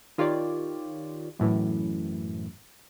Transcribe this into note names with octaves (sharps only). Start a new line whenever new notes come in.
D#3 F4 G4 C#5 D5
F#2 A2 E3